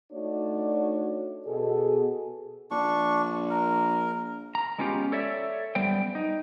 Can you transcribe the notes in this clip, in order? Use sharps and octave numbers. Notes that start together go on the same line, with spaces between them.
A3 D4 D#4 F#4 C#5 D5
B2 G#4 A4
A#1 D4 C#6
A#4
A#5
G#3 B3 C#4 F4 G4
A4 C#5 D5 E5
F#2 G3 B3 C5 G5
D#4